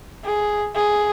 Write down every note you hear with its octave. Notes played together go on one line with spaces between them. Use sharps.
G#4
G#4